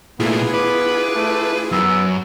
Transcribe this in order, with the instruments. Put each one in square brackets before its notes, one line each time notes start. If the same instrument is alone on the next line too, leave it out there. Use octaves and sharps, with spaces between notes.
[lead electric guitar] A#2 A3 [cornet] B3 [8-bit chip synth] E4 F4 G#4
[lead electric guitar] B4 [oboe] D6
[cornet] A3
[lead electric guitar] F#2 [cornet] B3 [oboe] E6